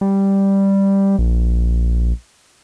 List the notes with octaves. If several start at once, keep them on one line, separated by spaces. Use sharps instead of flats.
G3
A#1